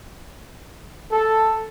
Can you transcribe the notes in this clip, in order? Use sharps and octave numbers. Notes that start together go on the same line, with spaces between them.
A4